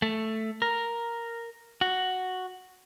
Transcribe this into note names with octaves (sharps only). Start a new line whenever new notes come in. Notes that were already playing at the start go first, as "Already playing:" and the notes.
A3
A#4
F#4